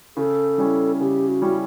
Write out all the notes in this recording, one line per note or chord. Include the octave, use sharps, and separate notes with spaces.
C#3 A4
G3 C#4 E4
C#3 G4
F#4
G3 C#4 E4